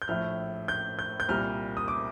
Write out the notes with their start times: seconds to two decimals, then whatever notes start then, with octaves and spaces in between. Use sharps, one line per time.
0.02 G6
0.08 A#1 A2 A3 F6
0.68 G6
0.99 G6
1.20 G6
1.29 C2 A#2 G3 F6
1.77 D#6
1.88 D6